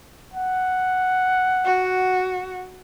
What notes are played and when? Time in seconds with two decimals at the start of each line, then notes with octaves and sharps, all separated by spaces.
0.34 F#5
1.65 F#4